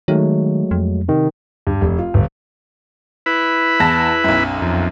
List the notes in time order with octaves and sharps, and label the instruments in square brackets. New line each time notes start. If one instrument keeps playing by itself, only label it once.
[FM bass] D#3 [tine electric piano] F#3 G#3 A3
[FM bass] F2
[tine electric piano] C3 D#3
[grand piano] G2
F1
F4
G1
[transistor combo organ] E4 B4 B5
[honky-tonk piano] E2 A5 A#6
B1 F#2
[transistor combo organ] F2